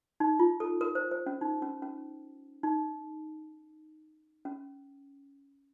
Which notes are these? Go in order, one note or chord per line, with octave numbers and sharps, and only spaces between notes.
D#4
F4
A4
A#4
C5
C5
C#4
D#4
C#4
C#4
D#4
C#4